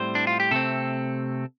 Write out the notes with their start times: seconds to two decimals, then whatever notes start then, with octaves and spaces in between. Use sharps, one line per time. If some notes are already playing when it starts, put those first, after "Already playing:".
Already playing: A2 G3 C4 C5
0.15 D4
0.27 F4
0.40 G4
0.51 C3 A3 C4 A4